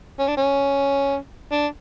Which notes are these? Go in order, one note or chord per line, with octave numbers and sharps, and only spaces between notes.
C#4
D4
C#4
D4